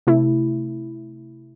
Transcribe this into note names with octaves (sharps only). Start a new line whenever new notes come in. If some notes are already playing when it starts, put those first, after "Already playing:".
C3 A3 E4